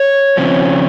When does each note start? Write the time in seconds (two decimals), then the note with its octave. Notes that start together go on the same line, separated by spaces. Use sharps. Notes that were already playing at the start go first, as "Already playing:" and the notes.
Already playing: C#5
0.37 C#3 F3 C4